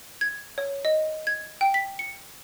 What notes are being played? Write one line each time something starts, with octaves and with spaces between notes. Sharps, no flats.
G#6
C#5
D#5
G#6
G5
B6
C#7